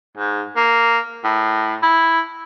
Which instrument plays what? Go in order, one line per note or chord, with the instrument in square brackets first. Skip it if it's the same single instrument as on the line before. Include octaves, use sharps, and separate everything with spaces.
[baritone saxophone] G#2
A#3
A2
E4